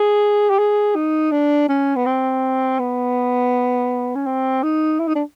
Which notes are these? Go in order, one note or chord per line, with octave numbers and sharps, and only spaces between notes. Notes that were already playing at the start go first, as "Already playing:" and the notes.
Already playing: G#4
G4
G#4
D#4
D4
C#4
B3
C4
B3
C#4
C4
D#4
E4
D#4
D4